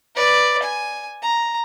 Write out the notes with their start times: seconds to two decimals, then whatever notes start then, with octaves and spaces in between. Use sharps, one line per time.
0.16 B4 D5
0.63 G#5
1.22 A#5